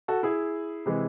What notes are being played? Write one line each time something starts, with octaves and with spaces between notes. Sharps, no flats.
F#4 A4
E4 G#4
C3 E3 G#3